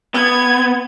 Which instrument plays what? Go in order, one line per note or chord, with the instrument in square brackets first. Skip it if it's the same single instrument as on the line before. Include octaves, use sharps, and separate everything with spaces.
[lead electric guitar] B3 [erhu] G#6